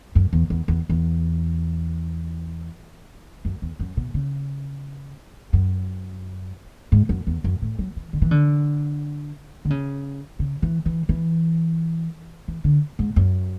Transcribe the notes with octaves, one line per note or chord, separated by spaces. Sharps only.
F#2
E2
E2
E2
E2
F#2
E2
F#2
B2
C#3
F#2
G#2
F#2
E2
F#2
A2
F#3
E3
D3
E3
D3
D3
C#3
C#3
E3
E3
E3
E3
D3
G#2
F#2